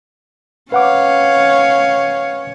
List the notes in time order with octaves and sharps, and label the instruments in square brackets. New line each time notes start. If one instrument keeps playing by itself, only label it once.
[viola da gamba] C#4 C#5 [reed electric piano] B4 F#5 D6 [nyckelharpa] F5